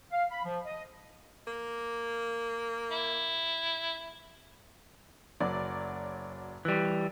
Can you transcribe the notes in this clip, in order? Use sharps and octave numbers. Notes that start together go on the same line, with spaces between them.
F5
B5
F3
D#5
A#3
E4
F#1 F#3 D5
E3 G3